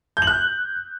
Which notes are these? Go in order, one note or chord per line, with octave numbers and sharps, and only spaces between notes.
G6
F#7
F#6